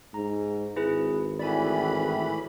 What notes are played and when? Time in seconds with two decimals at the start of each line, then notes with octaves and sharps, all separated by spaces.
0.14 G#2 A#5
0.76 G#1 E4 G#4 B4
1.39 A2 E3 D5 G#5 B5